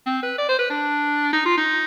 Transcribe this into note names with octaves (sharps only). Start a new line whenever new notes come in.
C4
B4
D5
C5
B4
D4
D#4
F4
D#4